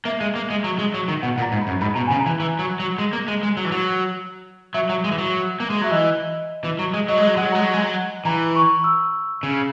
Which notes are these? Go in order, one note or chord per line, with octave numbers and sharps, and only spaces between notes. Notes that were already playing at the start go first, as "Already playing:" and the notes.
A#3 E5
G#3
A#3
G#3
F#3
G#3
F#3
D#3
B2 F#5
A#2
A#5
G#2
B5
F#2
G#2 B5
B2 A#5
C#3 G#5
A#5
E3
E3
F#3
F#3
G#3
A#3
G#3
G#3
F#3
E3
F#3
F#3 E5
F#3
G#3
E3
F#3
A#3
G#3
F#3 E5
E3 D#5
E3
F#3
G#3
F#3 D#5
G#3
F#3 D#5
G#3 F#5
F#3
G#3 A#5
F#3
G#3
F#3
E3 A#5
C#6
E6
C#3